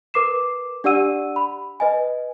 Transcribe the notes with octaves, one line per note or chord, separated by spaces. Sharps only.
A#4 B4 D6 C7 E7
D4 G4 D5 F#5 E6 D#7
B5
B4 D#5 G#5